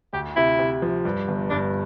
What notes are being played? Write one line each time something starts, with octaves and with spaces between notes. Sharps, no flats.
D2 G4
C3 E4
C3
F3
G2
G1
G2 D4